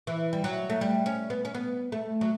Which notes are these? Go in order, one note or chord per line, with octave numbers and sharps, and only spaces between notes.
E3
G3
F#3
A3
G3
C#4
B3
C#4
B3
A3
F#3